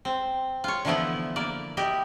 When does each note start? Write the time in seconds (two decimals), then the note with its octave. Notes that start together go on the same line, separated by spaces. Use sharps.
0.05 C4
0.64 F4 C#5
0.85 D3 E3 F3 A3 B3 E4
1.36 A#3 D5
1.77 E4 G4 D#5 E5